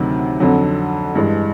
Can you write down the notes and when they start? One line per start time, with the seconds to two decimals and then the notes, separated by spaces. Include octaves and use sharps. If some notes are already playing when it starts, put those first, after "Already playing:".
Already playing: D2 C3 D#3 F#3
0.40 F2 D3 F#3
1.16 G2 E3 G#3